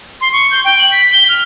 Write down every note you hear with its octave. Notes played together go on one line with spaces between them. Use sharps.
C6
C#6
G6
G5
F#7
B6
G7
F6